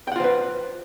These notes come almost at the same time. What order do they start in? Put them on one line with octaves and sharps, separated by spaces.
G5 F#5 F4 C5 B4